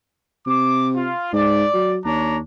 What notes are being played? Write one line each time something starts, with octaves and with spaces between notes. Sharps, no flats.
C3 D6
F4
G#2 D5
F#3
D#2 D4 C#5 A#5